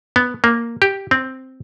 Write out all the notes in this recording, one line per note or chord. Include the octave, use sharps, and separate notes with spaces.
B3
A#3
G4
C4